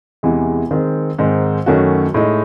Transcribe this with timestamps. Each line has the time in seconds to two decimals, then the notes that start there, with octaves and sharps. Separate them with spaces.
0.23 E2 C3 E3 G#3
0.71 D#3 G#3 C4
1.19 G#2 D#3 G#3 C4
1.66 F#2 D#3 A3 C#4 F#4
2.14 A2 G#3 D#4